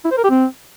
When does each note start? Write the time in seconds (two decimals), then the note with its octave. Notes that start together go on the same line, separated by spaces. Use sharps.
0.05 E4
0.11 C5
0.18 A#4
0.24 G4
0.30 C4